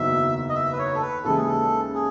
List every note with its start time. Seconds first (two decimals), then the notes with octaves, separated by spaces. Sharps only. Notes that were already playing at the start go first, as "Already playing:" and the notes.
Already playing: F#1 E2 D#3 F#3 E5
0.49 D#5
0.55 E5
0.72 B4
0.78 C#5
0.95 A4
1.02 B4
1.24 D#2 C#3 E3 G#3 A4
1.36 G#4
1.48 A4
1.95 G#4